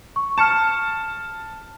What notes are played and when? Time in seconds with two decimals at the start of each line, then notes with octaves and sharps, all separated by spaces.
0.16 C#6
0.38 A5 F6 C#7 E7